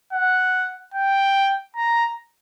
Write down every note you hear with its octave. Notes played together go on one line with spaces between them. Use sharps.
F#5
G5
A#5